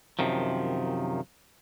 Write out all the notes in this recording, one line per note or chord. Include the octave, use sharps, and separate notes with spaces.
F#2 C3 D#3 F3